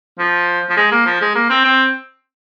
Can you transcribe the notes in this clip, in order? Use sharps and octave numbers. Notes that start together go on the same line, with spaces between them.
F3
F3
G#3
A#3
F3
G#3
A#3
C4
C4